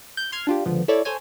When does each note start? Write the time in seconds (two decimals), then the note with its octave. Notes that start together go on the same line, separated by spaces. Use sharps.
0.17 G6
0.32 C6 F6 G#6
0.47 D4 F4 G4
0.65 C#2 D3 F3 B3
0.88 E4 A4 C#5 D5
1.05 A4 C5 C#5 G#5